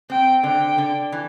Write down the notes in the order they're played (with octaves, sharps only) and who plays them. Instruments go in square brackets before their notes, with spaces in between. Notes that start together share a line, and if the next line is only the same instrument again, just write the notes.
[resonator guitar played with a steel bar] C4 [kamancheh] G5
[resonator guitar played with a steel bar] D3 [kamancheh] G5
[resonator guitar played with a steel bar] D3
E3